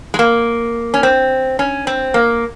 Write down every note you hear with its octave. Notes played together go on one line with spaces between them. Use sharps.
G#3
A#3
C#4
C4
C#4
C4
A#3